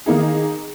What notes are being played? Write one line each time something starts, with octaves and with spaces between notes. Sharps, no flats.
D#3 A#3 D#4 G#4